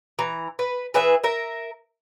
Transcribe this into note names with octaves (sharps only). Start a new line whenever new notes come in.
E3 A#5
B4
E3 G#4 B4 E5
A#4 E5